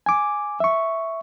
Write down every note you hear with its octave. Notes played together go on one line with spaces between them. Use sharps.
G#5 D6
E5 C#6